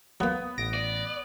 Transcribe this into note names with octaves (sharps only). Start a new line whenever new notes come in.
F#3 A#3 B3
A1 A#6 D7
D5